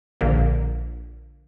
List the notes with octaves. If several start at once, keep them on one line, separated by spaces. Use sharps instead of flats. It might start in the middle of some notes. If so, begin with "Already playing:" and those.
A#1 D3 F3 A#3